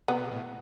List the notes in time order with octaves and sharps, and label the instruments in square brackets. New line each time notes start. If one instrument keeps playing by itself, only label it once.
[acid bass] C3 [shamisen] B3
[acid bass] B2
A2